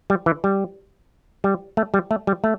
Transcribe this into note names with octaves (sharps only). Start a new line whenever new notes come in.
G3
E3
G3
G3
A3
G3
A3
G3
A3